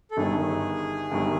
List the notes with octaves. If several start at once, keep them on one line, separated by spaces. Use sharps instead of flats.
A4
G1 G2 D#3 G#4
G1 G2 D#3